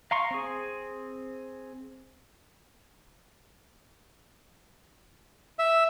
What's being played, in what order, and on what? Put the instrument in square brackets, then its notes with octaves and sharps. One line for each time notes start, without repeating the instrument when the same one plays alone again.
[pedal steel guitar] F5 A#5 C6 C#6
C4 G#4
[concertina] E5